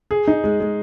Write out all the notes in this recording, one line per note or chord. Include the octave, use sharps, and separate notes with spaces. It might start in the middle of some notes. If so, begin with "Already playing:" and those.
G#4
D#4
G#3
G#3